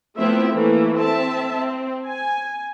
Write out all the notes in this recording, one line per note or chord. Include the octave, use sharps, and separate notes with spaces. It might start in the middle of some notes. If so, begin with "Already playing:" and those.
F3 A3 B3 C4 E4 E5
E3 A3 A#3
C4 E5 A5
C4
G#5